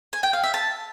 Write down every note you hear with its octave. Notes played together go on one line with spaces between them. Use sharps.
G#5
G5
F5
E5
A5